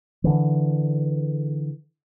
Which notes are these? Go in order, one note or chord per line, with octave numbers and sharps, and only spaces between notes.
D3 E3